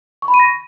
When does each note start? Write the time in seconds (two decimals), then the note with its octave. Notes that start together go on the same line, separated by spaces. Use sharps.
0.22 C#6
0.28 B5
0.34 D#7
0.39 A#6